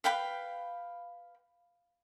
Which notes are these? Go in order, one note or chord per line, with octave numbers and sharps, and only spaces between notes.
B4 F5 G5 B5